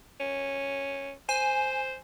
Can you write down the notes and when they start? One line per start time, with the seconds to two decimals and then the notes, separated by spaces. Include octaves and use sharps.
0.20 C#4
1.29 C5 G#5